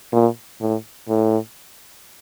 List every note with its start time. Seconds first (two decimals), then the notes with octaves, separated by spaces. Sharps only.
0.12 A#2
0.61 A2
1.08 A2